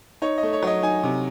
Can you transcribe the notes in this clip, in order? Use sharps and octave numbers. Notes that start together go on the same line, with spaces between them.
D#4 C#5
D#5
A3
C#5
F#3 D#5
D#4 G#5
C3